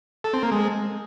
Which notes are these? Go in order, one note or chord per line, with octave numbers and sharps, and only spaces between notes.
A4
C4
A#3
G#3